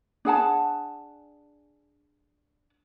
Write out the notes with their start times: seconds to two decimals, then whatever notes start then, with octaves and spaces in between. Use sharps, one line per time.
0.25 D4 G#4 F#5 A5